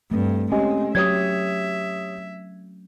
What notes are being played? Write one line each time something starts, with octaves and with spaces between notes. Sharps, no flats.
G2 A3 C4
G#3 C4 C#4 G4 D#5 G#5
F#3 G4 C#5 E5 D#6 G#6